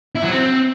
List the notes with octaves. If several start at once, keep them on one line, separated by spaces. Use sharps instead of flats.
E4
F#3
C4